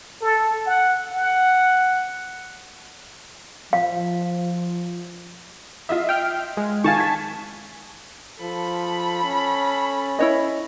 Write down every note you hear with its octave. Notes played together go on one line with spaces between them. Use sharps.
A4
F#5
F#5
F3 F5
F4 D#5 E5
G5 F6
G#3
D#3 F5 G#5 A5 C#6
G#6 B6
F3 A4 B5
C#4
E4 C#5 D#5